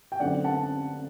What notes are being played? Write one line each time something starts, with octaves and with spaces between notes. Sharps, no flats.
G5
F#2 D3 A3 C4 D5 F#5
F#5 A5